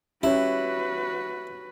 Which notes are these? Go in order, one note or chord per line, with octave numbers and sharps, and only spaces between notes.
C#4 E4 F#4 G4 B4 C#5